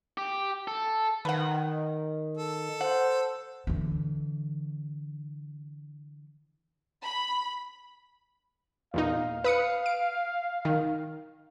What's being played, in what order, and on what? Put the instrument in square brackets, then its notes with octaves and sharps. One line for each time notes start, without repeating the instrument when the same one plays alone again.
[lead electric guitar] G4
A4
[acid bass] D#3 [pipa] B4 F#5
[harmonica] A4
[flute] C5 [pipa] F#5
[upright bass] D3 E3
[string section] B5
[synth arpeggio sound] E2 A#2 D#4 [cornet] F5
[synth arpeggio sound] B4 D#6 C#7
D7
D#3